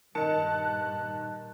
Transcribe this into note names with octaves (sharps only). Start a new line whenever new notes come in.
G2 A#2 D#3 A#4 D#5 A5 F#6 C#7